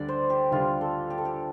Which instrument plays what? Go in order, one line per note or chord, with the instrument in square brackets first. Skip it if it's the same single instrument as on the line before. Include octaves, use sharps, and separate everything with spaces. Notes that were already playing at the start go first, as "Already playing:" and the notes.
Already playing: [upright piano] D2 D3 G3 [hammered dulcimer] D5
[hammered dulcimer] C5
G4
[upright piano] D2 D3 G3 [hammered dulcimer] F4
[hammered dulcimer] A4
G4
A4
G4